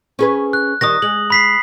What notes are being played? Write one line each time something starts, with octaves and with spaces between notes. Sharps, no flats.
C#4 G#4 B4
F#6
D#3 G3 D#4 D#6 A#6
G#3 F#7
B5 B6 C7